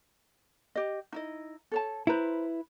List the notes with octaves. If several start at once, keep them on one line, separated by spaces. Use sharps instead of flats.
G4 D#5
D#4 E4 D#5
A4 C#5 A5
E4 B4 C5 A#5